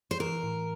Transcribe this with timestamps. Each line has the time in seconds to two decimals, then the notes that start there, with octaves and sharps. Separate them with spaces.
0.11 C5
0.20 E3 A#4
0.43 A2